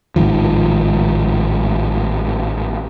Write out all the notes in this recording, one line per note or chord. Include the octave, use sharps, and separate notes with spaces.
A1 G#2 D#3 F3